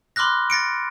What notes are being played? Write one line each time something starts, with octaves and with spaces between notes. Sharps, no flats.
B5 C6 D6 F6 F#6 A#6
A6 A#6 C#7 D7